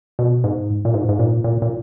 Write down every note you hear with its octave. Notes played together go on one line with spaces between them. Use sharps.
B2
G#2
A#2
G#2
G#2
A#2
A#2
A#2